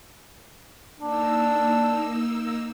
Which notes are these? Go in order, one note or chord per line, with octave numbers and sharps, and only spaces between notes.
A#3 D4 D#4 E6